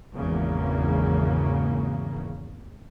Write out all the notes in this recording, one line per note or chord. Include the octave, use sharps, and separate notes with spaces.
G#1 E2 C#3 A#3